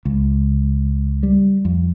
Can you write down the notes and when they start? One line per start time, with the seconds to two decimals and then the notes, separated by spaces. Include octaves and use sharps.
0.05 C#2
1.23 G3
1.65 F2